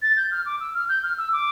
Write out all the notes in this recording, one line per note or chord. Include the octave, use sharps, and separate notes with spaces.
A6
G6
F6
D6
E6
F6
G6
F6
E6
D6